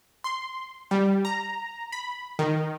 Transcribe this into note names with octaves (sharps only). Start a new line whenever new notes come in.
C6
G3
A#5
B5
D#3